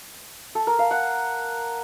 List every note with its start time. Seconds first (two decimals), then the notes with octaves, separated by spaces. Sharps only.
0.55 A4
0.67 A#4
0.79 F5
0.91 F#5